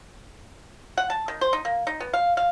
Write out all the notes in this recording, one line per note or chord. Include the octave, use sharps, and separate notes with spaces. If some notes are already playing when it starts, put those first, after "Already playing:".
F#5
A5
D#3
C5
D#4
A#3
D#4
B3
F5
F5